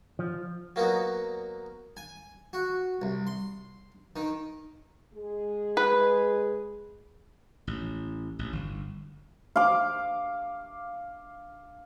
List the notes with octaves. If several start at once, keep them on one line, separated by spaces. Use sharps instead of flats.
F3
F#3 A#3 B3 D#4 F#4
G#5
F#4
C2
C6
D#3
G#3 G#4
B4
A1
A1
G1
F5 D6